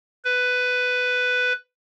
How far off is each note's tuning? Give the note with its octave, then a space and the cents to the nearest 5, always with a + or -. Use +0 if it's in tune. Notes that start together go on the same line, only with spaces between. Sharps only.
B4 +10